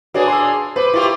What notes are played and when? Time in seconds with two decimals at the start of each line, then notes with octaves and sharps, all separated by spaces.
0.14 A#3 D4 F#4 G#4 B4 C#5
0.28 C6 E6
0.76 B4 C5 D6
0.94 A#3 E4 F4 G4 C#6